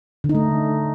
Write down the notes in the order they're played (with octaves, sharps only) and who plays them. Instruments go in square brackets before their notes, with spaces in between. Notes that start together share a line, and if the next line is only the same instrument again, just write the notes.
[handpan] D3
D#4
A3